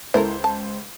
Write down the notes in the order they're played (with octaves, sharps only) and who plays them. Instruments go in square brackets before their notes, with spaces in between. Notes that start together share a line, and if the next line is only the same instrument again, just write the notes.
[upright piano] C#2 C5 [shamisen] E4 A4 A#4
[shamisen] A5